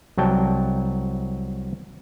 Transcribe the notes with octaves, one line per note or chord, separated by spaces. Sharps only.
C2 F#3 G5 A5